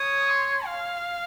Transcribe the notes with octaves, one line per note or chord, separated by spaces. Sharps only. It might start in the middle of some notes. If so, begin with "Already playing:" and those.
Already playing: C#5 D#6
C6
F5